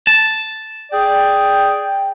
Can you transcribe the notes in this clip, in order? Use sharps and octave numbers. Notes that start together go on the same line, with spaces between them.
A5
G#4 D5 G5